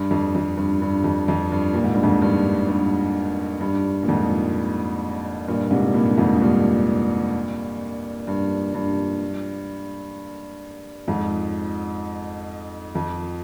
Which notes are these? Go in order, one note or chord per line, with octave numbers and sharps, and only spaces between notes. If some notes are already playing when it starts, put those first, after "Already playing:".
Already playing: G2
F2
F2
G2
G2
F2
F2
G2
A#2
G#2
G2
F2 G#2
G2
G2
G2
A#2
F2 G#2
G2 A#2
G#2 C3
G2 A#2
F2 G#2
G#2
G2 A#2
G2
G2
F2 G#2
F2